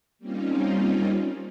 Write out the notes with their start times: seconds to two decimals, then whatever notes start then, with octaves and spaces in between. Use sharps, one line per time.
0.19 G3 A#3 C4 C#4 D#4 F4